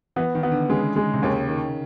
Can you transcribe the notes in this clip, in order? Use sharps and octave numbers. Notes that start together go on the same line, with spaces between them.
E3 B3
D#3
B3
D3
C#3 G#3
G#3
C3
D#2 C#3
D#3